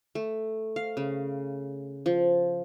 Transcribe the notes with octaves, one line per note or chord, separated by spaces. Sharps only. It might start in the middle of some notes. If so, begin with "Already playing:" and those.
A3
F5
C#3
F3